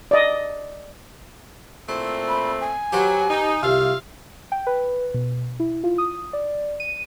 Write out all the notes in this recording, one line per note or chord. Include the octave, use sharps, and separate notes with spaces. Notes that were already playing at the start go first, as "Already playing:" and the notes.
D5 D#5
A#2 A3 C4 E4
B5
G#5
F#3 G4 B4 C5
D#4
C2 C3 F4 E5 F5
G5
B4
B2
E4
F4
D#6
D5
D#7